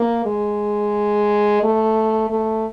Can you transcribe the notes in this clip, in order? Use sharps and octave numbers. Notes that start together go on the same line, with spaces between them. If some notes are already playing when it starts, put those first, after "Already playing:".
Already playing: A#3
G#3
A3
A3